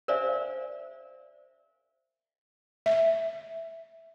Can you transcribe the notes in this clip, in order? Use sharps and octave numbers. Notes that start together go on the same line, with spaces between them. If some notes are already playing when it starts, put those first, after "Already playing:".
A#4 C5 D5 E5 F5 G#5
E5